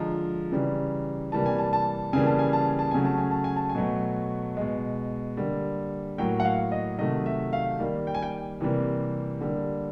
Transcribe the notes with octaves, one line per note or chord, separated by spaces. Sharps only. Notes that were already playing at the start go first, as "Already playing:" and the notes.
Already playing: D3 F3 G#3 A#5
C#3 E3 G3
C3 E3 G3 A#3 A5
G#5
A5
A5
C#3 E3 G3 A#3 G#5
A5
G#5
A5
G#5
A5
C#3 F#3 A3 G#5
A5
G#5
A5
G#5
A5
G#5
B2 F#3 A3
B2 G#3
D3 G3 A#3
A2 F#3 A#3 G5
F#5
F5
D#5
C3 D#3 F#3 A3 D#5
E5
F5
D#3 G3 A#3
G5
G#5
G5
C3 E3 G3 A#3
D3 G3 A#3